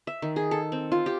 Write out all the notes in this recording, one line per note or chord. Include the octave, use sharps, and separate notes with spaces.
E5
D#3
G#4
A4
C4
F4
G4